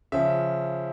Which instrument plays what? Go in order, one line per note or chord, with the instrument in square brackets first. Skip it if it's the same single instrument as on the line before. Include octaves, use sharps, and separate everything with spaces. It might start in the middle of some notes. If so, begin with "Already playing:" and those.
[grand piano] C#3 F3 E5